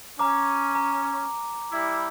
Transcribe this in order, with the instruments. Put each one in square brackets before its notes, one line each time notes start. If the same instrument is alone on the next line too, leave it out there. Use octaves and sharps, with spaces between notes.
[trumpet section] C#4 [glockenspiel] A#5 D6
[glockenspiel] A#5
[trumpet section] G3 E4